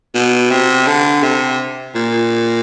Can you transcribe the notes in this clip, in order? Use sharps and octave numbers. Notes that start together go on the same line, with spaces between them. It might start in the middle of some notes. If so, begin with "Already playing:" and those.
B2
C3
D3
C3
A#2